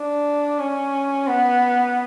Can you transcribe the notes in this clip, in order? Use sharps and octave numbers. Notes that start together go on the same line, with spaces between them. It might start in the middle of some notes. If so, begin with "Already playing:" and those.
Already playing: D4
C#4
B3